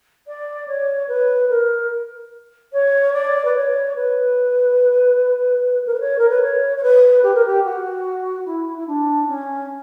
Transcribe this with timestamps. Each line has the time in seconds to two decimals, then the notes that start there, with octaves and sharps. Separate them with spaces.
0.27 D5
0.67 C#5
1.08 B4
1.49 A#4
2.73 C#5
3.13 D5
3.45 B4
3.55 C#5
3.95 B4
5.86 A#4
5.93 B4
6.00 C#5
6.18 A#4
6.29 B4
6.41 C#5
6.77 C#5
6.83 B4
7.23 G4
7.34 A#4
7.45 G4
7.64 F#4
8.45 E4
8.77 E4
8.87 D4
9.28 C#4